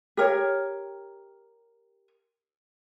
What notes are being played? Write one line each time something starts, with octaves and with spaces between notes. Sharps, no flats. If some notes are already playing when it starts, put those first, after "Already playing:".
G4 A#4 C#5